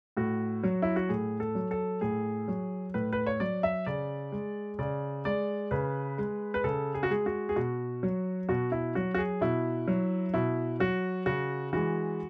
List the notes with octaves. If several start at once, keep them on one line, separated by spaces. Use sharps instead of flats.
A2 F#4
F#3
E4
F#4
A2 G#4
A4
F#3
A4
A2 G#4
F#3
A2 B4
B4
C#5
F#3 D5
E5
C#3 D5
G#3
C#3 D5
G#3 D5
C#3 B4
G#3
B4
C#3 A4
G#4
F#4
G#3 G#4
F#4
G#4
B2 F#4
F#3
B2 F#4
E4
F#3 F#4
F#4
G#4
B2 E4
F#3
B2 E4
F#3 F#4
C#3 F#4
E3 G#3 F#4